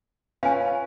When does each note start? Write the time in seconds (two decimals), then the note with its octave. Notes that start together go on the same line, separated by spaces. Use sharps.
0.43 C#4 F4 B4 F5 G#5